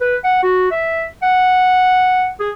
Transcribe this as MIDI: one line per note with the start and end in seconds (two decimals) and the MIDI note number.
0.01 0.16 71
0.24 0.41 78
0.43 0.71 66
0.71 1.06 76
1.23 2.27 78
2.40 2.50 68